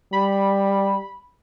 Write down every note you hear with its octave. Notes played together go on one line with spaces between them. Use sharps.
G3 B5